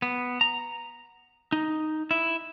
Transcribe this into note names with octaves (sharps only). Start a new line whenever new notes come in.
B3
A#5
D#4
E4